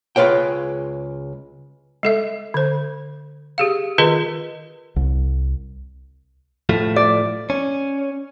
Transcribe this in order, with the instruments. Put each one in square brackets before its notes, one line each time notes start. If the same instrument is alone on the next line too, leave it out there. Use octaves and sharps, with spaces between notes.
[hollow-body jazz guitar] C#2 G#3 F4 B4 C#5 G5
[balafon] G#3 A4 E5
D3 C5
G4 G#4 F5
D#3 F4 G#4 A#4 B4 D#5
[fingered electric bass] C2
[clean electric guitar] A2 F3 A3
[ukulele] D5
[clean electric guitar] C#4